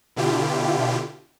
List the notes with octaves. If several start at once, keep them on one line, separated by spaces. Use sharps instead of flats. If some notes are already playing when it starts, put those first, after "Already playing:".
B2 D3 E4 F4 G4